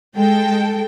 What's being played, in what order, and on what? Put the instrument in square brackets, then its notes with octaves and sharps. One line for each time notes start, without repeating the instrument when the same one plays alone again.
[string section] G#3 A4 G5